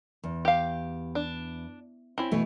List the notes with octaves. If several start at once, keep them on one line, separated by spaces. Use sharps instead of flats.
E2
G4 F5
D4
C4 C#4 E4
B2 E3 A3